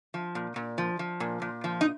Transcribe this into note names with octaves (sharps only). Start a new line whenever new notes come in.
F3
A#2
A#2
F3
F3
A#2
A#2
F3
D#4